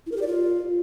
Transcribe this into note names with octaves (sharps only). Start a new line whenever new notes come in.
E4
A#4
G4
D5
F4